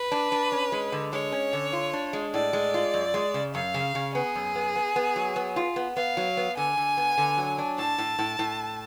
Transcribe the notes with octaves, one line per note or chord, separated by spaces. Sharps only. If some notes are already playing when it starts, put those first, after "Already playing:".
Already playing: B4
D4
D4
C#4
G#3
D3
G#3 C#5
C#4
D3
F4
D4
G#3
A2 D5
G#3
F4
F#2
G#3
C#3
F#2 F5
C#3
C#3
B3 G#4
F#2
B3
B3
B3
F#3
B3
F4
B3
B3 F5
F#3
B3
D3 G#5
D3
B3
D3
F#3
D4
A2 A5
A2
A2
A2